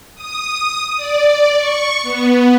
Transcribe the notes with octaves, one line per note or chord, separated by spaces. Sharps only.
D#6
D5
C#6
B3